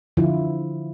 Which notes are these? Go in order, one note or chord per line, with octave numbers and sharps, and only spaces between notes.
D3 F3 E4 F4